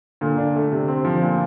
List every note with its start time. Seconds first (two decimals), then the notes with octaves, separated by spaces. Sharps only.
0.21 A#2 D3
0.38 D4
0.56 A3
0.72 C3
0.88 C4
1.05 F3
1.22 A#2